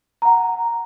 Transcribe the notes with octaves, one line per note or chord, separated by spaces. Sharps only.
F#5 A#5